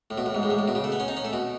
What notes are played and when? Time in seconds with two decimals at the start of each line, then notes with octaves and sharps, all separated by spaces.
0.10 A2
0.18 B2
0.26 A2
0.35 G#2
0.43 A2
0.50 G#2
0.59 A2
0.68 B2
0.75 C#3
0.84 A3
0.92 B3
1.00 C#4
1.08 D#4
1.17 C#4
1.25 A3
1.33 B2